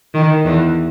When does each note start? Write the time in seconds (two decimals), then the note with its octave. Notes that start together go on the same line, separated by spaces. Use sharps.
0.14 D#3
0.45 E2 E3